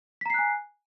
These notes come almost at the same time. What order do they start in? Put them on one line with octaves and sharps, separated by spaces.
B6 A#5 C7 F#6 G#5